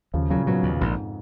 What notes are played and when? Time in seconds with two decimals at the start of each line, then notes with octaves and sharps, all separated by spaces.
0.14 D#2 C#3 F3
0.30 A#2 C#3 F#3
0.46 G#2 B2 F#3
0.63 D#2
0.81 A#1 F2 G#2